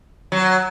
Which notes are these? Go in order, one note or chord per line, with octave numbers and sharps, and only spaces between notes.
F#3